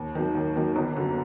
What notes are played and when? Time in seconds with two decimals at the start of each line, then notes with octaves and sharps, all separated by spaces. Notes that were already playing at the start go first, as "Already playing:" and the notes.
Already playing: D#2
0.15 D#3 F#3 A#3
0.35 D#2
0.56 D#3 F#3 A#3
0.76 G1
0.96 F#2 D3